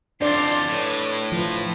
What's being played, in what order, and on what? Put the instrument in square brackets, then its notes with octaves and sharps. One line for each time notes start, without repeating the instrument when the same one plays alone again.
[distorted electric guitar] F2 E3 [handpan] D4 D5 [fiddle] C6 F6
[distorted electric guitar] A2 [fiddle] B4 C#5
[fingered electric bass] F3 [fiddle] B4 C5